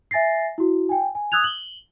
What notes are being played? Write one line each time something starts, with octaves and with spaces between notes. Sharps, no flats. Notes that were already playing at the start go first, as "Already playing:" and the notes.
E5 G#5 A6 A#6 C7
E4 F#4
G5 G#5
G#5
D#6 E6 F#6 G#6 F7
F#7 G7